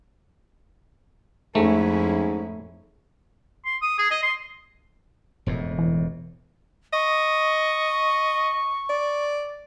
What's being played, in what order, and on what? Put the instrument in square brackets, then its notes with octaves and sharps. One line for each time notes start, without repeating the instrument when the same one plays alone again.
[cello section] F2 C#4 E4 [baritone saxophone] G#2 [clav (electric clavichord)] A3
[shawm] C6
D#6
G#4
D#5
C6
[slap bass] E1 F2 A2
[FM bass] E3
[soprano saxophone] D#5 [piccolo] C#6
[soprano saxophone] D5